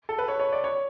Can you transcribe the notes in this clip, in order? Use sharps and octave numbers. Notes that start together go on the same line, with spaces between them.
A4
B4
C#5
C#5
D5
C#5